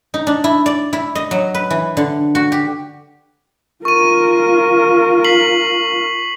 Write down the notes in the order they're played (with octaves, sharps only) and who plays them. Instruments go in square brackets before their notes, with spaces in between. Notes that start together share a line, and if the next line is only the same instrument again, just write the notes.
[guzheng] D#4
D4
E4
D5
E4
D#5
F#3
B4
E3
D3
F#4
G4
[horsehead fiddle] F4 A#4 [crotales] C#6 D#7
[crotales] B6 C7 F#7